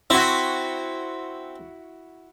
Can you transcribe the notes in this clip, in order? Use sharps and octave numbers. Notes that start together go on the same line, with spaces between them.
C4 E4 F#4